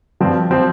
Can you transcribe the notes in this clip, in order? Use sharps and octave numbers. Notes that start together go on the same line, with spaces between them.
G2 F3 C4
F3 C4